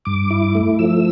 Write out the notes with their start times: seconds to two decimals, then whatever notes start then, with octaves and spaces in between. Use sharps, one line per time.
0.05 G2 D6
0.30 E4
0.55 A3
0.79 F3 E6